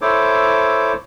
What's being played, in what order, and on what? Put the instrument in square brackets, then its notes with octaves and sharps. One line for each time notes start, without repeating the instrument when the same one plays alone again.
[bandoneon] E4 A4 C5 C#5 D6